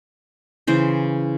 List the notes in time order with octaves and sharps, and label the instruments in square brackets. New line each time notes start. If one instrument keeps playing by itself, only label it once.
[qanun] C#3 E3 C5